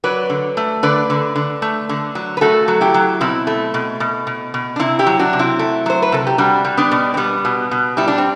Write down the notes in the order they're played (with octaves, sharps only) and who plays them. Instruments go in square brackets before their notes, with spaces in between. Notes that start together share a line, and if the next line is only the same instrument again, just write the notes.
[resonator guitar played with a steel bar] F#3 B4 D5
D3
A3
D3 B4 D5
D3
D3
A3
D3
F#3
B4
A3 F#4 A4
F#3
E4 G4
F#3
B2 C4 E4
A3
B2
B2
B2
B2
D4
C3 C4 E4
E4 G4
F#3
D4 F#4
C3
C4 E4
A3
F#3 C5
B4
C3 A4
G4
G3 D4 F#4
G3
B3 D4
B2
C4
G3 B3
B2
B2
G3 E4
D4
C4